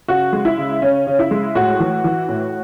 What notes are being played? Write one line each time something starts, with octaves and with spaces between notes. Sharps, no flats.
C#3 F#4
G#3
E4
C#3
C#3 C#4
C#3
E4
G#3
A2 F#4
E3
E3
A2